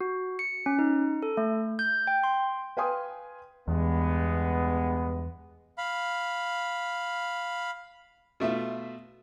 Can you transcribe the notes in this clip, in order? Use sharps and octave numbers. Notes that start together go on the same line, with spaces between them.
F#4
C#7
C#4
D#4
A4
A3
G6
G5
C6
B4 F5 G5 G#5 C6 D#6
E2 G2 G#3 B3
F5 B5
B2 A3 F4 E5